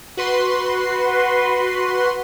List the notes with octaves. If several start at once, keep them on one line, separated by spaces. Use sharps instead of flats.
F#4 B4 C6